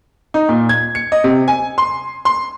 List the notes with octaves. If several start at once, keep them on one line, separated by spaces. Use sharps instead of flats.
D#4
A#2
G#6
C#7
D#5
C3
G#5
C6
C6